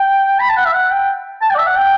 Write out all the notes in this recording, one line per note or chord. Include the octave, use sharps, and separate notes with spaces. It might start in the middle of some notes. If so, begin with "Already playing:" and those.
Already playing: G5
B5
A5
F#5
E5
F#5
G5
A5
G5
D5
E5
F#5
G5